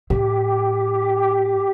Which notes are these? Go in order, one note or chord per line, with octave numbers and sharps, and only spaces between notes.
A2 G4